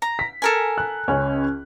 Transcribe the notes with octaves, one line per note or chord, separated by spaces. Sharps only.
A#5
B6
A4 A#4 G#5
F#6
C#2 C#4